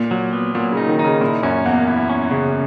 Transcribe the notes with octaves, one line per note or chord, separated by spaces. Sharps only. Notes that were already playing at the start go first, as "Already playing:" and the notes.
Already playing: A#2
F#3
B3
A#2 F#3
C#3
D#4
D#3
D#4
C#3
A#2 E4
F#2 C#4
E2 A#3
E4
C#4
C#3